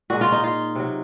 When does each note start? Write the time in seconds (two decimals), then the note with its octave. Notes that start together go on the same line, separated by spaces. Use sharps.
0.10 A#2 G#3 F#4
0.21 F4
0.32 D#4
0.44 F4
0.75 C3 F#3